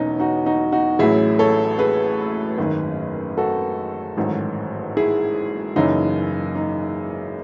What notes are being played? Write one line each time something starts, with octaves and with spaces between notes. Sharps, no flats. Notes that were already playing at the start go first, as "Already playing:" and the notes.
Already playing: E1 E2 B2 F#3 C#4 D#4
D#4 F#4
D#4 F#4
D#4 F#4
A1 A2 F#3 E4 G#4
A4 C#5
G#4 B4
G#1 F#2 D#3
F#4 A4
A1 G#2 D#3 F#3
E4 G#4
F#1 F#2 C#3 E3 D#4
D#4